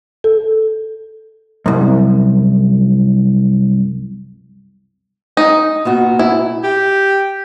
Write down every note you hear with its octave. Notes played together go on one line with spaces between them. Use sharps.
A4
C2 F#2
D#4
A#2 B3 F#4
E4
G4